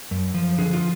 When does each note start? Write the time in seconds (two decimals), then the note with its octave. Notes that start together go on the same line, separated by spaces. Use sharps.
0.11 F#2
0.34 F3
0.58 D3 G#4
0.74 F4